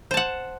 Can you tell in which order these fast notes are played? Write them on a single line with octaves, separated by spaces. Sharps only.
C5 A5 F#5